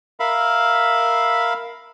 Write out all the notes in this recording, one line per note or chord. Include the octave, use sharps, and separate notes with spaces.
A#4 E5 F5 B5